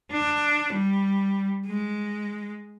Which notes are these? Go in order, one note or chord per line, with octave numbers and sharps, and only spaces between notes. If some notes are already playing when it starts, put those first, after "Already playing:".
D4
G3
G#3